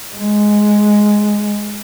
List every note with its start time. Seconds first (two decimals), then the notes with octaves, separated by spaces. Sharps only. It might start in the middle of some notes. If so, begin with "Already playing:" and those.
0.15 G#3